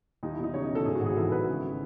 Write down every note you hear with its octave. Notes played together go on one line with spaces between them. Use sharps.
D#2 D#4
E4
E1
D#4
C#3 C#5
D#5
E1
A4
G#2 G#4
F#4
G#1
G#4
E3 A4
G#1 B4
C#3